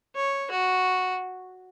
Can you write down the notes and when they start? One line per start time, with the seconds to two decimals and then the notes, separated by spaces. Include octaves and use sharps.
0.16 C#5
0.51 F#4